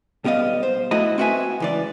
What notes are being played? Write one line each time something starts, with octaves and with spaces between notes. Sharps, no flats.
B1 G3 B3 D#5 F5
C5
A3 E4 F#4 D#5 B5
C4 E4 F#4 B4 E5 G#5
C#2 E3 D5